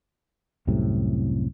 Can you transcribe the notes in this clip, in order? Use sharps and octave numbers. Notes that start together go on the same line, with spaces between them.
C2 F#2 A2 C3